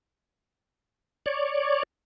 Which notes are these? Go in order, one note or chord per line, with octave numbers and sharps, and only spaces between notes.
C#5 D5